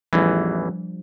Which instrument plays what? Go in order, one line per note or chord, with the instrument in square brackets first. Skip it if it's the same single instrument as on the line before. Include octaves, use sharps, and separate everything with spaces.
[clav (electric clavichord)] A1 E2 E3 [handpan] F3 G3 D4